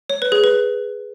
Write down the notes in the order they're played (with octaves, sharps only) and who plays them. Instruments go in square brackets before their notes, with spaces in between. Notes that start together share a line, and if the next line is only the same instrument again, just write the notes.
[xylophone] C#5
B4
G#4
B4